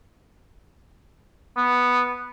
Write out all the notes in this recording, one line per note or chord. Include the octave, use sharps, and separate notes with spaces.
B3